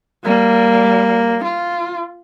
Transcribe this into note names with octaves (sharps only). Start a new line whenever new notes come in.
G3 A#3
F4